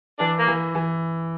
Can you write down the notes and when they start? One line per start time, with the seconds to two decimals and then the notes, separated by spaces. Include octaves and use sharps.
0.19 E3 D4
0.39 A#3
0.47 E3
0.75 E3